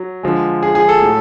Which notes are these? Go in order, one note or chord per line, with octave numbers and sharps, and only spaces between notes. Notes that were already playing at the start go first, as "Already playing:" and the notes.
Already playing: F#3
D3 F3 G#3
G#4
G#4
A4
A2 F#3